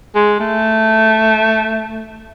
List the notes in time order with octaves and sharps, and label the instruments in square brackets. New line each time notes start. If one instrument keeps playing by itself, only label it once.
[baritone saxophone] G#3
A3